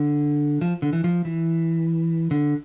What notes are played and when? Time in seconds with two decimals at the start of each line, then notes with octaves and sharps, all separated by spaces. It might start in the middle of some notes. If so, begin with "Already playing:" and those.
Already playing: D3
0.61 F3
0.82 D3
0.93 E3
1.04 F3
1.25 E3
2.31 D3